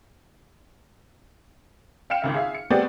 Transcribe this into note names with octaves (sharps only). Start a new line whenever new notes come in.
F5 G5 F6 C#7 E7
G#1 C#2 E5
G#4 E5 F5
C#7
G3 A3 B3 C4 G#4 D5